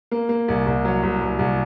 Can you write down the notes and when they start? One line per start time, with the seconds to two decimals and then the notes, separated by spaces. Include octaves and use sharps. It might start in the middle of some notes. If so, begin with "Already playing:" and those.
0.11 A#3
0.29 A#3
0.48 C2
0.66 C2
0.85 F#3
1.03 C2
1.21 C2
1.39 C2